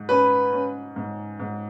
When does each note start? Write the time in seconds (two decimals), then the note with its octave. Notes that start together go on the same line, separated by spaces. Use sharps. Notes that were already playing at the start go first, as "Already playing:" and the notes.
Already playing: G#2
0.09 C#4 B4
0.53 C#4
0.96 G#2
1.40 G#2